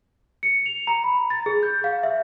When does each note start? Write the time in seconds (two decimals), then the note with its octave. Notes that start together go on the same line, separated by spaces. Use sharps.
0.43 C#7
0.66 F7
0.87 A#5
1.04 B5
1.30 A6
1.46 G#4
1.63 G6
1.84 F5
2.03 E5